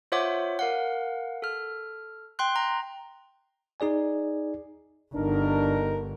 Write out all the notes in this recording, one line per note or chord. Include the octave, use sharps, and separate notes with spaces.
F4 C5 C#5 E5 F#5 D6
A#4 F5 F#5
A4 F6
G5 C6 F#6
A#5
D#4 G#4 D5 G#5
G1 D4 D#4 A#4